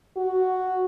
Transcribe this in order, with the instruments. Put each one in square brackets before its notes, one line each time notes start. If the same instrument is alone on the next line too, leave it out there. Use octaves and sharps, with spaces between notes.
[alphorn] F#4